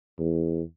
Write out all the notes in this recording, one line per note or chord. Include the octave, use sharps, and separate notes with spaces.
E2